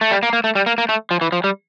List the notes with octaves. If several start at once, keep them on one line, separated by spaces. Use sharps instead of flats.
A3
G3
A#3
A#3
A3
G3
A#3
A#3
A3
F3
E3
F3
G3